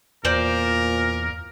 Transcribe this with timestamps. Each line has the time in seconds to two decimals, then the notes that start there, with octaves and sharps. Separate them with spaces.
0.25 E2 A#2 A#4 C5 D5